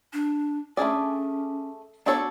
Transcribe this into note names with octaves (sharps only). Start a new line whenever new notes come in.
D4
A3 C#4 D4 G#4 D5
B3 D4 F#4 A4 C#5